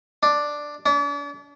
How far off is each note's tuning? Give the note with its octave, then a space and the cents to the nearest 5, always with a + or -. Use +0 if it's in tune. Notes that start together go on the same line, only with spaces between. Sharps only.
D4 +5
D4 -40